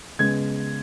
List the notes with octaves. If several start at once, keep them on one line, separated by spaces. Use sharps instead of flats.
C#3 G#3 B3 G#6